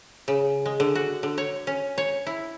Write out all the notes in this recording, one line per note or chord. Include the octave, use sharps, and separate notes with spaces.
C#3
G#3
D3
F#4
D3
C#5
C#4
C#5
E4